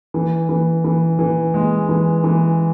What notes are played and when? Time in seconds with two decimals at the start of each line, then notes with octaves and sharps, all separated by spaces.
0.14 E3
0.49 E3
0.84 E3
1.19 E3
1.54 G#3
1.89 E3
2.24 E3